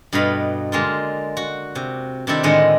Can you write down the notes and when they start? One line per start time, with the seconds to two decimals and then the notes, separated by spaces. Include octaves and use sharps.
0.13 G2 B2 A3 D#5 F5 B5
0.72 D3 G#3 A#3 F4
1.37 F#4
1.75 C3
2.27 C3 D#3 C4 D4 E4 A4
2.43 A2 D3 D#3 G#3 D#5 F#5